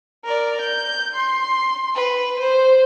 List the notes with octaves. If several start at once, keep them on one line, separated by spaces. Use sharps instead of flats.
A#4 D5
G6
C6
B4
C5